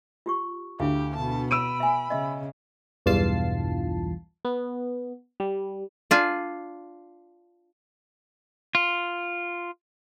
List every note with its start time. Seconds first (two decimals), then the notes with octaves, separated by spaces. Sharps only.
0.26 F4 G4 C#6
0.80 D2 E4 G4 F5
1.16 B2 A5
1.51 B5 E6 D7 D#7
1.80 E5 G#5
2.10 C#3 D#5 E5
3.06 B1 E2 G2 F4 A5 C7
4.45 B3
5.40 G3
6.11 D4 F4 G#5
8.75 F4